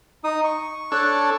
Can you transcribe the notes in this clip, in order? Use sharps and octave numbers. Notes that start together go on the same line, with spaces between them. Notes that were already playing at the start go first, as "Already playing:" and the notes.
D#4 D#6
C#6
D4 A4 C#5 F#6